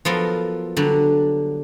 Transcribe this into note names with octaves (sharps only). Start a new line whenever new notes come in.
F3 F#3 B3 A4 A#4
D3 F#3 G3